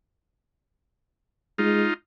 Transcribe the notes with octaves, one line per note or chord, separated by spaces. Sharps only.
G#3 D#4 F4